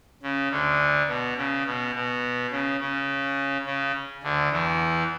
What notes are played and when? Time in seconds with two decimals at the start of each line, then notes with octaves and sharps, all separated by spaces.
0.23 C#3
0.51 D2 D3
1.08 B2
1.37 C#3
1.66 B2
1.95 B2
2.51 C#3
2.80 C#3
3.66 C#3
4.23 D2 D3
4.52 E2 E3